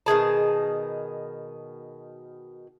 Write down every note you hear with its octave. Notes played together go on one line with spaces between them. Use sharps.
B2 D#3 G#4 A5